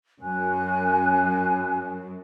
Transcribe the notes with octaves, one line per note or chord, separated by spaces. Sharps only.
F#2 G#5 F#6